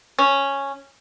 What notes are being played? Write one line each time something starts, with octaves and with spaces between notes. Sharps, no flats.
C#4